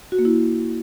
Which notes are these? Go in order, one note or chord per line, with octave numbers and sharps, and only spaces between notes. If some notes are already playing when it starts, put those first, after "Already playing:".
F#4
A#3
E4